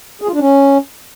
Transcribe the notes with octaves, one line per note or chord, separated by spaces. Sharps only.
G#4
F4
D4
C#4